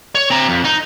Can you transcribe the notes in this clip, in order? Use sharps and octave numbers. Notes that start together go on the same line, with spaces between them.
C#5
C4 A#5
F2
D#4